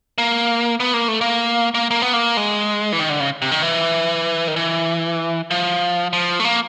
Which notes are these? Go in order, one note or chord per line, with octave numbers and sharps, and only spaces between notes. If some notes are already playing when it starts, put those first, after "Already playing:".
A#3
B3
A#3
A3
A#3
A#3
A#3
B3
A#3
G#3
E3
D#3
D3
C#3
C3
D#3
E3
D#3
E3
F3
F3
A3
A#3